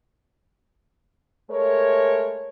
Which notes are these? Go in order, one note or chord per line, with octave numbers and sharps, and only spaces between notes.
G#3 A3 A#4 C#5